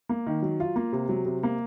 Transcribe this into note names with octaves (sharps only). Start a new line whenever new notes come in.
A#3
D#3
F#3
F4
A#3
C3
F#3
C3
A#3